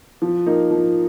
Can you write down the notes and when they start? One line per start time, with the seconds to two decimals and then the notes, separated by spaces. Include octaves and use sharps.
0.22 F3
0.46 A#3 D#4
0.71 F3